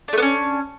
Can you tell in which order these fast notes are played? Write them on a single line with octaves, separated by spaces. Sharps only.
D4 A3 B3 C#4